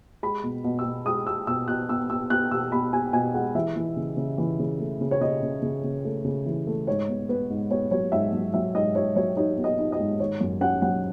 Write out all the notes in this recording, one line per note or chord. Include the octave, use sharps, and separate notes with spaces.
G#3 B5
B2
B2
E6
B2
G#3 D#6
G#3 E6
B2 E6
B2 F#6
B3 E6
B3 E6
B3 F#6
B2 E6
B2 B5
B2 G#5
B2 G#5
G#3 F#5
E3 E5
E3
C#3
C#3
E3
C#3
A3
C#3
C#5
C#3 D#5
C#3
C#3
C#3
A3
C#3
E3
A3
G#2 C#5
B3
B3 B4
G#2
B3 C#5
F#3 C#5
G#2 E5
F#3
F#3 E5
G#2 D#5
G#2 C#5
F#3 C#5
D#4 C#5
B3
D#5
D#4
D#5
G#2
D#3 C#5
F#2
C#4 F#5
F#3 F#5